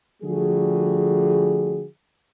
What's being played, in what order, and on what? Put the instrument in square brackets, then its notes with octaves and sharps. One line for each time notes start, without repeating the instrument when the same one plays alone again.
[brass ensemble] D3 F3 G3 A3 F#4 G#4